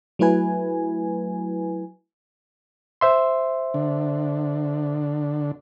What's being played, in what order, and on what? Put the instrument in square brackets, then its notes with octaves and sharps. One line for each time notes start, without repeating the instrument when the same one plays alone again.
[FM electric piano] F#3 A3 E4 B4 G#5
[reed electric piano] C5 E5 C6
[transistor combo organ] D3